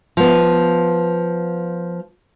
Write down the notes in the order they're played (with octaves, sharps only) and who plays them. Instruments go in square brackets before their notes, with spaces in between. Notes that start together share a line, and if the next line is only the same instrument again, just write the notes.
[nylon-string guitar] F3 B3